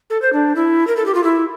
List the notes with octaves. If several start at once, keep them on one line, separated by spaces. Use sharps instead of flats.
A4
C5
D4
E4
A#4
A4
G4
F4
E4